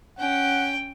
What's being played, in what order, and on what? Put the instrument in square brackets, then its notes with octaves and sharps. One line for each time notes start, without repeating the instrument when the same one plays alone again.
[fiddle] C#4 G5 [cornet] F#5